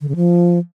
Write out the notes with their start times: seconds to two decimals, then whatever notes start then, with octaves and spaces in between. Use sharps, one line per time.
0.01 D3
0.08 C#3
0.16 F3